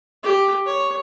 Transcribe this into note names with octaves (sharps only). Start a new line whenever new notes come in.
G4
C#5